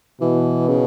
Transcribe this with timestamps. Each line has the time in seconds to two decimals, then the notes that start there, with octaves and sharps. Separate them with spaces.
0.21 B2 E3
0.68 C#3